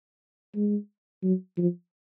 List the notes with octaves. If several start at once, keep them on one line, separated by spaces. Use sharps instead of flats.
G#3
F#3
F3